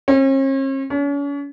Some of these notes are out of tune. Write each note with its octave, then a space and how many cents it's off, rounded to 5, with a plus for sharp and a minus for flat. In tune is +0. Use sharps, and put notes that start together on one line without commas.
C#4 -45
C#4 +40